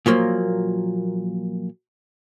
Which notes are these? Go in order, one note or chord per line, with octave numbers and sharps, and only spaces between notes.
A#2 F3 F#3 A#3